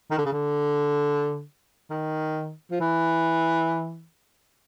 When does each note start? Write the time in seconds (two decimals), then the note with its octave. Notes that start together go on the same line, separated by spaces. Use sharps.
0.11 D#3
0.18 D3
0.25 C#3
0.33 D3
1.90 D#3
2.71 F3
2.80 E3